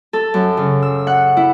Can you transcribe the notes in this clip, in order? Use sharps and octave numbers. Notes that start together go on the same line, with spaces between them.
A4
F#2
C#3
E6
F#5
E4